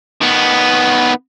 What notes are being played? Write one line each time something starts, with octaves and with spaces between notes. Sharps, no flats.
D#3 B3